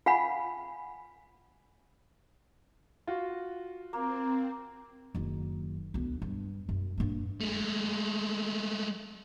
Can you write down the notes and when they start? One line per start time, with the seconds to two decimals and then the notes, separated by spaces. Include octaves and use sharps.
0.06 F4 F5 F#5 G#5 B5
3.07 F4 F#4
3.93 A#3 C4
5.15 F#1 D#3
5.94 D2 B3
6.22 G2
6.69 F#2
6.98 G2 A#3
7.41 G#3 A3